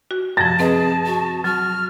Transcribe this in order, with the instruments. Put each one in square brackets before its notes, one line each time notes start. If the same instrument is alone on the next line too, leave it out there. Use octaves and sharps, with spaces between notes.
[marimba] F#4
[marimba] F#2 C3 F3 [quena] A5 [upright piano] A6 A#6
[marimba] C4 B4 D#5 [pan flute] G#4
[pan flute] F#4
[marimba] F#3 [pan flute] F#4 [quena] F6